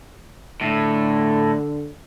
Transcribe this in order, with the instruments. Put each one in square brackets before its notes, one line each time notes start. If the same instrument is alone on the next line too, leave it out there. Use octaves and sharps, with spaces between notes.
[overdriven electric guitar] A2 [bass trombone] D3